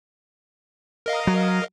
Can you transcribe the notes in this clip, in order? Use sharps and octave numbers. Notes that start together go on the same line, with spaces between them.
A#4 D#5 F5
F#3